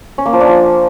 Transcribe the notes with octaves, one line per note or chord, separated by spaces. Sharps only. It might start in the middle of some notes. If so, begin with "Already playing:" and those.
C#4
A#3
F3
D4
F3